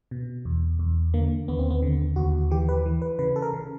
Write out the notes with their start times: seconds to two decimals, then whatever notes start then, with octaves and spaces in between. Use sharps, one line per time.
0.11 B2
0.45 E2
0.79 E2
1.14 D3 A#3
1.48 D#2 B3
1.59 C4
1.70 B3
1.82 D3
2.16 D#2 F#4
2.51 E3 G4
2.69 B4
2.86 E3
3.02 B4
3.19 C#3 B4
3.36 A4
3.42 A#4
3.53 C#3